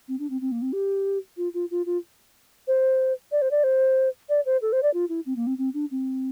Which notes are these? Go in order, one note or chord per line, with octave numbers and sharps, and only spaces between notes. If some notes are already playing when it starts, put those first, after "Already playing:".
C4
D4
C4
C4
A#3
C4
G4
F4
F4
F4
F4
C5
D5
C5
D5
C5
D5
C5
A4
C5
D5
F4
E4
C4
A#3
C4
C4
D4
C4